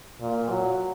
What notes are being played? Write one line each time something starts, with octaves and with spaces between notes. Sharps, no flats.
A#2
F#3